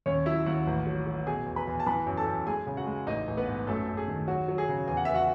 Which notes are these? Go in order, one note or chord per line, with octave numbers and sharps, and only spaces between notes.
D#2 C#4 C#5
F#3 E4 E5
D#2 F#4 F#5
A1
F#3
F#3
B2 G#4 G#5
E2
B4 B5
E2
A5
E3 B4 B5
F#2
A4 A5
F#2
G#3 G#4 G#5
C#3
F#4 F#5
G#3
A1 D#4 D#5
A1
B3 B4
G#2
F#2 A3 A4
F#2
G#4
D#3
F#3 F#4
F#3
G#4
C#3
E2 G#5
F#5
B3 E5
F#4 F#5